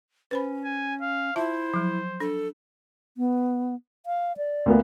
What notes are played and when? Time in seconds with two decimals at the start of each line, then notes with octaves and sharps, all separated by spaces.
0.31 C#4 B4 C5 B5
0.64 G#5
1.01 F5
1.36 E4 F4 C5 E5 A5
1.74 F3 F#3
2.20 D4 A4
3.17 B3
4.06 F5
4.37 D5
4.66 D2 A#3 B3